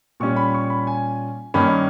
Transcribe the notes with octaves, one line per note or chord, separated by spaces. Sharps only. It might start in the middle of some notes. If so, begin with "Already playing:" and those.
A#2 G3 C#4 C#6
B5
C#6
B5
G#5
G2 D#3 A#3 C#4 B5